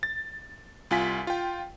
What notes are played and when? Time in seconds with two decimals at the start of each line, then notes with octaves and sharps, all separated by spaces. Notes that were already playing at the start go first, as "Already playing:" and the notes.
0.03 A6
0.91 C2 F4 G#5 B6
1.27 F4 G5